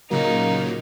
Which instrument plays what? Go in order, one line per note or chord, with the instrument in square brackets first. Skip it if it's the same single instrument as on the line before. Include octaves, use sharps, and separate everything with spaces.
[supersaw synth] A#2 C#3 F#3 [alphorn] A#3 [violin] D#4